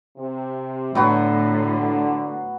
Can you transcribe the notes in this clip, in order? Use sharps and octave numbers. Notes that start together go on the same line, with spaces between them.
C3
A2 D3 F#3 B3 F#4